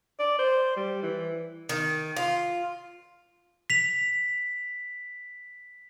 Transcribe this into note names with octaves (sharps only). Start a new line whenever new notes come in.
D5
C5
G3
E3
D#3
F4
B6 F7